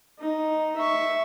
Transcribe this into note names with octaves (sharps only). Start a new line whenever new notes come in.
D#4
E5 C#6